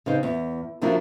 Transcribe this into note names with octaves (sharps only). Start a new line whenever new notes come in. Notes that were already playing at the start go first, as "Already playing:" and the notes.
C#3 B3 D#4 C5
E2
C3 F3 D4 E4 F#4 A#4